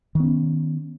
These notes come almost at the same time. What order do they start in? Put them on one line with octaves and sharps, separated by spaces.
D#3 B3 C#4